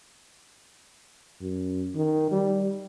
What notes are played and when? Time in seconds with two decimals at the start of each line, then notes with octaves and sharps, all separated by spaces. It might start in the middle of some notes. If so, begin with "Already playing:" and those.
1.41 F#2
1.95 D#3
2.31 G3